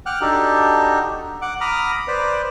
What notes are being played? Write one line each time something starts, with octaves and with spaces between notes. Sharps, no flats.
F#5 G5 D6 F6 F#6
D4 D#4 F#4 G4 A4
F#5 D6
A#5 B5 D6 D#6 F6
B4 C5 D5